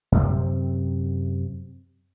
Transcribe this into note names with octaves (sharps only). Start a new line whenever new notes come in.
F#2 C3 C4